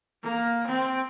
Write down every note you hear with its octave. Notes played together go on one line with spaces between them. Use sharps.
A#3
C4